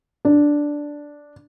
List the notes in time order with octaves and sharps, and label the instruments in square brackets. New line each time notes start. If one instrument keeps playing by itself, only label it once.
[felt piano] D4